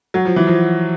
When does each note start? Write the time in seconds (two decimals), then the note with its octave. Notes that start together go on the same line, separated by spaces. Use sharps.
0.14 F#3
0.25 F3
0.36 E3
0.47 F3